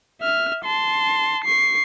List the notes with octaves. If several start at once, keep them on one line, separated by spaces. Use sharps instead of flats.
E5 F6
A5 C6
C#6 C7